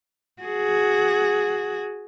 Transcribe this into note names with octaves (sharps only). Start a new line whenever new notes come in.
F#4 G#4